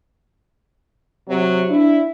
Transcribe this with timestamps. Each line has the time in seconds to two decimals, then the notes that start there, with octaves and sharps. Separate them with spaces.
1.29 C3 F#3
1.69 D4 E4